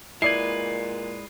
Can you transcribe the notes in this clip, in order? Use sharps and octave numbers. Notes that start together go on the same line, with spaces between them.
A#2 G#3 E4 B4 D5 G#6 C7